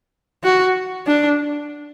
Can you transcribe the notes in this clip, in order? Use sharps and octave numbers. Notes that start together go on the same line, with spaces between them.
F#4
D4